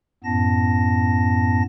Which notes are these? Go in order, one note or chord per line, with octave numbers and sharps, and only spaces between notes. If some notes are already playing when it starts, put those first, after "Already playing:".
F#2 A2 B3 A5 A#6